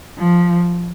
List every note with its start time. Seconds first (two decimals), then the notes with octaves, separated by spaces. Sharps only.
0.18 F3